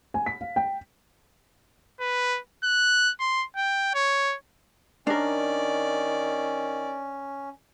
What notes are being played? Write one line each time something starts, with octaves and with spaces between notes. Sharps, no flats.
G#5
B6
F5
G5
B4
F#6
C6
G5
C#5
D#3 C#4 D4 A#4 D5